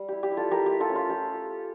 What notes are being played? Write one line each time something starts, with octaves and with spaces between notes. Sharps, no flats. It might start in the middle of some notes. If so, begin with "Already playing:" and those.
Already playing: G3
E4 G4
G4
E4
F4 A4
A3 G4 A#4
G4
A3
F4 A4
C#4
F4
F4 G4